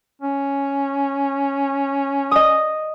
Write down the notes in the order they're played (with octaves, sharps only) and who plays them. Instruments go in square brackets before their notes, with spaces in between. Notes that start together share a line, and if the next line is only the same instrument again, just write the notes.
[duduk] C#4
[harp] D#5 D#6